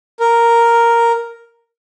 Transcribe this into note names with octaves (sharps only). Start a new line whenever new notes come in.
A#4